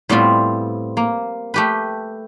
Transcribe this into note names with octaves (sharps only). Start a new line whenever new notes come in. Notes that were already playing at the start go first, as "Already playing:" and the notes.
A2 G3 B3 C4 F4
A#3
A3 G4 B4